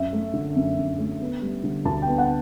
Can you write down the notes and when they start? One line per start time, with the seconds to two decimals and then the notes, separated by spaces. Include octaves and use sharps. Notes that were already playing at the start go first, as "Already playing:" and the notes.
Already playing: F#2 E5
0.13 A3
0.34 D3
0.56 F#2
0.77 F#2
0.98 A3
1.21 B3
1.42 G3
1.63 D3
1.85 D2 A5
2.02 G5
2.07 B3
2.18 F#5